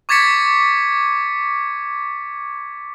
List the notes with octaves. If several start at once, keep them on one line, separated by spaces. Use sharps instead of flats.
C#6 D6 G#6 A6 B6 C#7